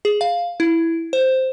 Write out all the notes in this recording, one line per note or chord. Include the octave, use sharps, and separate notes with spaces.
G#4
F5
E4
C5